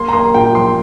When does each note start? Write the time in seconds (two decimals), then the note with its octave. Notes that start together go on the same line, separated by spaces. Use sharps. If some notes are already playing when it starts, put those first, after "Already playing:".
Already playing: A#3 C6
0.09 A#5
0.13 A#3 C6
0.34 A#2 G5
0.55 F3 C6